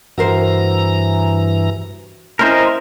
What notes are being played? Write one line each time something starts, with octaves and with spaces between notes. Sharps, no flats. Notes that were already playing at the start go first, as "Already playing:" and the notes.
G2 E3 F#4 A#4 C5 A#5
C4 C#4 E4 A#4 C5 D#5 E5